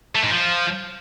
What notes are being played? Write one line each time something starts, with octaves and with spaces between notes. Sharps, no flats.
A3
G#2
F3